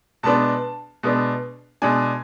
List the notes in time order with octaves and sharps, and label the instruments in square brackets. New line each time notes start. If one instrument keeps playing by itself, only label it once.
[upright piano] B2 G#3 B3 D4 A5
B2 G#3 B3 D4
B2 G#3 D4 G#5